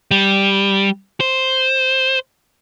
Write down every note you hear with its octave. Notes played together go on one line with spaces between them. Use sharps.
G3
C5